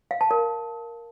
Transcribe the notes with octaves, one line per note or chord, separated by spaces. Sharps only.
F5
A5
A#4